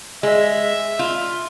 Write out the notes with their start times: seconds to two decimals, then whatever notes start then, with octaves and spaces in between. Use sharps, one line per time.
0.23 G#3 E5
0.99 F4